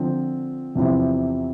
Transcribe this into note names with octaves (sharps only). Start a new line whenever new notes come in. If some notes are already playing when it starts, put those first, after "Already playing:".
Already playing: D3 F3 C4 F4
E2 C3 F3 C4 E4